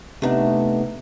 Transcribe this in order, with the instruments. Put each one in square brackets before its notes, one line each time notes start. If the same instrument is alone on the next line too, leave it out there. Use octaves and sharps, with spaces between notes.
[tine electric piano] C3 B3 D#4 [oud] A3 D4